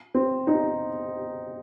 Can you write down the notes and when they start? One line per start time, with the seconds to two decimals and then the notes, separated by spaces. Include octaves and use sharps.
0.14 C4
0.47 D#4